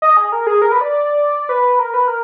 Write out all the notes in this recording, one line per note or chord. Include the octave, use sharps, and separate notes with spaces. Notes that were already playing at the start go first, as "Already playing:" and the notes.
D#5
G#4
A#4
G#4
A#4
B4
D5
B4
A#4
B4
A#4